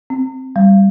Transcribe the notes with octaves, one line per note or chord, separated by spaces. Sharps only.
C4
G3